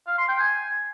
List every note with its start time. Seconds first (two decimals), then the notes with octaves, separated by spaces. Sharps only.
0.07 F5
0.18 C6
0.29 G5
0.39 G#5